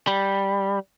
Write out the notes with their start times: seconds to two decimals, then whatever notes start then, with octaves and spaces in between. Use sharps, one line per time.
0.07 G3